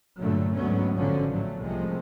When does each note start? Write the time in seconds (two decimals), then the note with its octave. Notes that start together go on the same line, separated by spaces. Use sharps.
0.19 G2 A#2 D3 F#3 A3
0.54 D2 G#2 F#3 A3 B3 C#4
0.95 A1 D3 F3 F#3 C#4
1.31 A2 F#3 A3
1.61 C2 C3 F3 G#3 A3